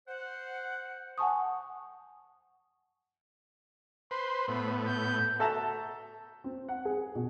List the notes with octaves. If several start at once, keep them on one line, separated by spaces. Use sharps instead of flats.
C5 F#5
F#5 G#5 A5 C#6 D#6
B4 C5 C6
A2 B3 B5
G6
F#4 A4 E5 A5 A#5
C4
F#5
G#4
B2